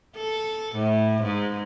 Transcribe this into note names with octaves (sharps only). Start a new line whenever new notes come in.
A4
A2
G#2